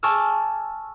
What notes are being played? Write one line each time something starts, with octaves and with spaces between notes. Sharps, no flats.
G#5 A5 C#6 D6 E6 F6